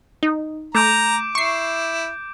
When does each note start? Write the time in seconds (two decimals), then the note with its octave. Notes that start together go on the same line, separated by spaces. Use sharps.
0.23 D#4
0.75 A3 A#5 D6 G6 D7
1.35 E4 C#6 C7